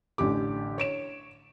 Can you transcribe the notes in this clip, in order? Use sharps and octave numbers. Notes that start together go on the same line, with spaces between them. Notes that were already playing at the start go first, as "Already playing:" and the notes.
A1 D3 C#4 G4 D6
C#5 D7 E7